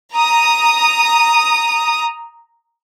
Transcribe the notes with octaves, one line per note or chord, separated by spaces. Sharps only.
A#5 D#6